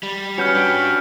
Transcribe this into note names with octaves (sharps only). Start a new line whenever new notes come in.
G3
C#4 F#4 B4 F6 G6 C#7
D4 G4 F6 B6 D7